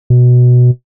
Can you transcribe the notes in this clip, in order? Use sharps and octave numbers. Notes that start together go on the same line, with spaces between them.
B2